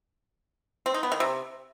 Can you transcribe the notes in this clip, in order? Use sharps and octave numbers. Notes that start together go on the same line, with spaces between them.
C4
D#4
B3
D#3
C3